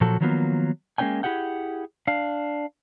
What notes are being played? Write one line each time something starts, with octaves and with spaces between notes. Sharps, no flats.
A#2 F3 F#3 F#4 A4
D#3 F3 F#3 A#3 B3 F4
G#3 A#3 C#4 C#5 G5 G#5
E4 G4 G#4 F#5 G5
D4 F5